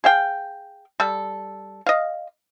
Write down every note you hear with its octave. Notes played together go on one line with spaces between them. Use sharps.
G#4 F5 G5
G3 A4
D#5 F5